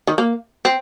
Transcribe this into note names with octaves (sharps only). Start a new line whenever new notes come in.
D#3
A#3
C4